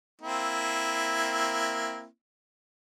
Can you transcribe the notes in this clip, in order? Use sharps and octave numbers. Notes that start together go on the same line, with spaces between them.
A#3 C4 E4